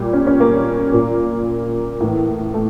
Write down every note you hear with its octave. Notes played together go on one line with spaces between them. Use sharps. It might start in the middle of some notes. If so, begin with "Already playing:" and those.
Already playing: A#2 G3
C#4
C#4
A#3
A#2
A2 E3
A3